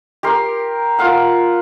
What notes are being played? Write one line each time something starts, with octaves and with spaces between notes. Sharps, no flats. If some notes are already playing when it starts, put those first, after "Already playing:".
G4 A#4 C6
F4 A#4 F5 F#5